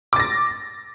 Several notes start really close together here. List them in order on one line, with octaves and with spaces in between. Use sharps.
D6 A6 A#6